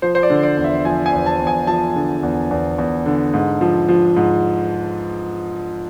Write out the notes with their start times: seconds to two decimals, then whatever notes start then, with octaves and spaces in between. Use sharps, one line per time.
0.02 F3 C5
0.15 C5
0.23 D5
0.30 D3
0.43 D5
0.57 E2
0.64 E5
0.85 F3 G#5
1.06 G#5
1.13 E2
1.26 A5
1.40 E2
1.47 G#5
1.67 F3 A5
1.96 D3
2.23 E2
2.51 E2
2.78 E2
3.06 D3
3.34 G#2
3.61 F3
3.89 F3
4.17 G#2